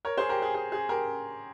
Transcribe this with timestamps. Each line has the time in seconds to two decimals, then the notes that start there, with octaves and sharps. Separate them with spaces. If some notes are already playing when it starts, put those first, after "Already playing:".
0.05 A#4 C#5
0.18 G#4 C5
0.29 G4 A#4
0.42 G#4
0.55 G#4
0.72 G#4
0.89 G4 A#4